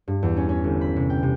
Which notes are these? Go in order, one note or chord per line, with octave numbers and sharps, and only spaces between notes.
G2
E2
C#4
C#4
G1
B5
C3
G5
C3